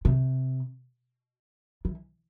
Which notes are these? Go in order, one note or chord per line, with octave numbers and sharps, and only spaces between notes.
C3
E3